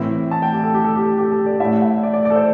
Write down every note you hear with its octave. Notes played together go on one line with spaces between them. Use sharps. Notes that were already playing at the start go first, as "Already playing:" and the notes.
Already playing: A2 E3 C4 E4
A5
G5
G4
A4
G4
A4
G4
G4
A4
D5
A2 A3 E4 E5
E5
D5
D5
D5
A4
C5